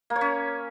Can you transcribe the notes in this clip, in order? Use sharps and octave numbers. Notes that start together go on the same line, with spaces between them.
A#3
C#5
C#4